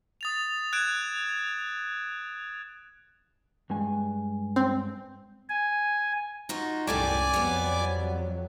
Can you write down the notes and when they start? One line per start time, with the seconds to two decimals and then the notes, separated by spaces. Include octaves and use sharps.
0.21 D#6 A6 F7
0.73 F#6 G#6 D7 E7
3.70 G2 G#3 G#5
4.56 C4
5.50 G#5
6.49 D#4 F4 F#4
6.87 C2 F#2 A2 G3 A3 D5 G#5 D6
7.34 F2 F#3 G3 B3